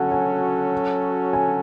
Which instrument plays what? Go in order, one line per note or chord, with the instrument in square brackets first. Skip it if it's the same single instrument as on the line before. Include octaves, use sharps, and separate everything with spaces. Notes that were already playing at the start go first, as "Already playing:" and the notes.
Already playing: [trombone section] F#3 C#4 F#4 A4 [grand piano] F#5 G#5
[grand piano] G#5
G#5